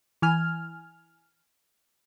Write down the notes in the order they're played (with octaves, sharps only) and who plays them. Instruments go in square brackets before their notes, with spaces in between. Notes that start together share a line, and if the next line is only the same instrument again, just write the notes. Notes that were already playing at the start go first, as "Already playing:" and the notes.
[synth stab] E3 G#5 F6